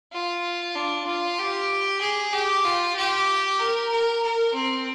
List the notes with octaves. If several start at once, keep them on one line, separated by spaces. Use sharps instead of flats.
F4
D4
F4
G4
G#4
G4
F4
G4
A#4
A#4
A#4
C4